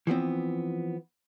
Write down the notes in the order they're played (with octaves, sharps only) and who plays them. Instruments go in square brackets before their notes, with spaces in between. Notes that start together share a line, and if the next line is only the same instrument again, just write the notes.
[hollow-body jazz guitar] E3 F3 B3 C4